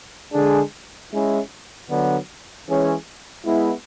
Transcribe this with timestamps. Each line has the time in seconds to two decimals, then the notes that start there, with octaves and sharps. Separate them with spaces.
0.33 D3 G#3 D4 G#4
1.11 G#3 C#4 E4
1.89 D3 F#3 B3 D4
2.66 E3 G#3 C#4 G#4
3.44 G#3 B3 E4